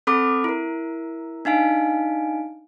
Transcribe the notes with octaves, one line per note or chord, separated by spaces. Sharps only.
C4 A4 B5 D6 F6
E4 A#4
D4 D#4 F5 G#5